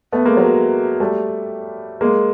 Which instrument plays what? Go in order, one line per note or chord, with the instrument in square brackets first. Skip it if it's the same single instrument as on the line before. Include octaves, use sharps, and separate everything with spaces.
[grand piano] A3 B3
G#3 A#3
F#3 G#3
G3 A3
G#3 A#3